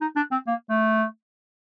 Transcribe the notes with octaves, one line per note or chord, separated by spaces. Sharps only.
D#4
D4
C4
A#3
A3